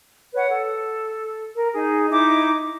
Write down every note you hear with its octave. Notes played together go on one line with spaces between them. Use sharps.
B4 C#5 F#5
A4
A#4
D#4 G#4
D#4 E4 D6